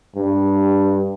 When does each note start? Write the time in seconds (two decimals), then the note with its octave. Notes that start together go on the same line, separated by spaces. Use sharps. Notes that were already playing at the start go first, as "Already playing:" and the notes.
0.16 G2